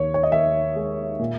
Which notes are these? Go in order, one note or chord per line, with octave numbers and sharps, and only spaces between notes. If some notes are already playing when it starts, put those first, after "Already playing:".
Already playing: D#2 C#5
C#5
D#5
D#2 E5
G#3
A#2